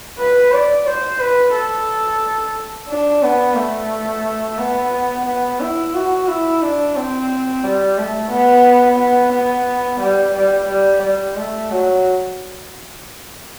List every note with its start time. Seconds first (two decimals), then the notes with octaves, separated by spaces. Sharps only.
0.18 B4
0.52 D5
0.86 C5
1.20 B4
1.54 A4
2.89 D4
3.23 B3
3.57 A3
4.59 B3
5.26 B3
5.60 E4
5.94 F#4
6.28 E4
6.62 D4
6.96 C4
7.63 G3
7.98 A3
8.31 B3
8.99 B3
9.33 B3
10.00 G3
10.35 G3
10.68 G3
11.03 G3
11.36 A3
11.70 F#3